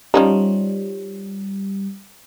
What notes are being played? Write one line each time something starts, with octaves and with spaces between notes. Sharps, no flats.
F3 G3 C#4 D#4